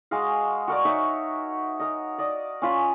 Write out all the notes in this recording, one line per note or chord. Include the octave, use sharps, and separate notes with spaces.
G#3 F#4 D#5 F5
F#4 A#4 D5
D#4 C#5 E5 E6
A#4 D#5
D5 D#5
C#4 F4 B5